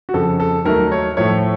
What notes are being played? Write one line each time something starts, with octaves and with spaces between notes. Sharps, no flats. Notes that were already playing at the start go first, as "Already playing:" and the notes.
F#4
F2 C#3 F3 A4
A4
D#2 D#3 F#3 A3 A#4
C#5
A2 F3 A3 C#5